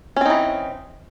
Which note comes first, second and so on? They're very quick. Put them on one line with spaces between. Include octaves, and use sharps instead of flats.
C#4 C4 D#4 E3